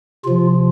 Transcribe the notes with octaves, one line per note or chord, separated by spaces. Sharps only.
C3 F3 F4